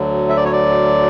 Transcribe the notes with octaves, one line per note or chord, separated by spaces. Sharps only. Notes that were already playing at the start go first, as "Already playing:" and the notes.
Already playing: D2 D3 F#3
E5
D5
C#5
D5